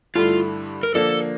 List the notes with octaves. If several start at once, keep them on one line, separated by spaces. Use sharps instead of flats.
G2 D3 A3 E4 F4
A#4
D3 F3 A#3 D4 A4